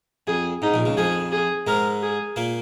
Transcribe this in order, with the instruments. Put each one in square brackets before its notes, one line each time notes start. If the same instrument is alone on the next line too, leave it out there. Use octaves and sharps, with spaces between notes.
[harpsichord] F2 [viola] G#4
[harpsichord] G#2 [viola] D#4
[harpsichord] A#1 A#2
C#2 C#3
[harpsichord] F2 F3 [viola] G#4
[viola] G#4
[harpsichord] G#2 G#3 [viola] A#4
[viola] G#4
[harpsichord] A#2 A#3